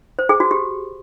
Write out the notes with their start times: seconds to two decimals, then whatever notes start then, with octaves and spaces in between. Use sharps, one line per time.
0.19 C5
0.29 G#4
0.40 F#4
0.51 G4